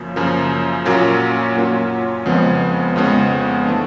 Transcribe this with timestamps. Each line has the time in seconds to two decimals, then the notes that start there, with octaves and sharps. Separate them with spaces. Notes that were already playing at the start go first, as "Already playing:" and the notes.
Already playing: F#2 C#3 F3 A#3
0.16 F#2 C#3 F3 A#3
0.85 A#2 F#3 A#3 C#4 F4
1.56 A#2 F#3 A#3 C#4 F4
2.26 F2 C#3 F3 G#3 B3
2.96 F2 C#3 F3 G#3 B3
3.66 E3 A3 D4